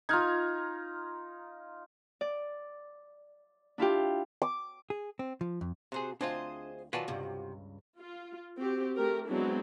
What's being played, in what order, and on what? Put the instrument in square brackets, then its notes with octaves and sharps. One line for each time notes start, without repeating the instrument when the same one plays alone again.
[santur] D#4 F4 [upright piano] A#5 F6 G#6
[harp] D5
D4 E4 F4 G4
[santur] D6
[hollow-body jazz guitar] G#4
C4
F3
F2
[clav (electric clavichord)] C3 G#4 [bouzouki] F#4 C5
[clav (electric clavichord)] D2 C4 F4 [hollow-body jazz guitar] D4 [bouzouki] G#4 C5 D#5
[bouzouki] D#3 F#3 [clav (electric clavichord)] F4 F#4 D5 [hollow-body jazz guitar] B4 G#5 A5
[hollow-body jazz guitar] C#2 G2 [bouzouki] C3
[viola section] F4
C4 F#4 G4
A3 G4 A#4
F#3 G#3 B3 C4 D4 E4